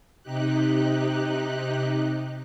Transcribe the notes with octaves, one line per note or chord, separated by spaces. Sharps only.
C3 D#4 G4 F#6